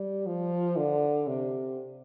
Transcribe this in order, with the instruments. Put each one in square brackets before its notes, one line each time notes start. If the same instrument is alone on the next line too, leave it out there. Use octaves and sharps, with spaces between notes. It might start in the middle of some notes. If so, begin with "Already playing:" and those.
Already playing: [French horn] G3
F3
D3
C3